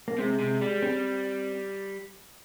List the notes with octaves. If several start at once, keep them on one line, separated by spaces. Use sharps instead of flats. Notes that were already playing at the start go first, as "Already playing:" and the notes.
A#3
C3 G#3
C3
G3
C4